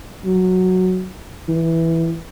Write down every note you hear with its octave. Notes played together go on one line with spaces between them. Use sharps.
F#3
E3